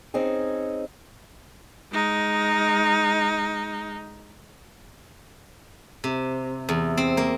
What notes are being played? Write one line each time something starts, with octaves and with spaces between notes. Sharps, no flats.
C4 C#4 D#4 G#4
G#3 D#4
C3
E2
C4
A#3